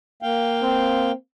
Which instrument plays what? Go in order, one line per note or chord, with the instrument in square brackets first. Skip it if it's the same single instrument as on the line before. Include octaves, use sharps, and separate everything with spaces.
[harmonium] A#3 F5 G5
[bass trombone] C4